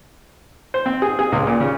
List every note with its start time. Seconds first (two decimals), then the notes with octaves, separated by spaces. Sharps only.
0.74 C5
0.86 C4
1.02 G#4
1.19 G#4
1.32 C#2
1.47 A#2
1.60 C#3